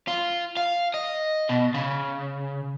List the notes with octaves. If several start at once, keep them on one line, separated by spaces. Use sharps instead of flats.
F4
F5
D#5
B2
C#3